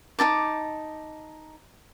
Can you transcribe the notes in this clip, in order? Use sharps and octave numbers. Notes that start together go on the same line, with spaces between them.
D#4 E4 A5 D6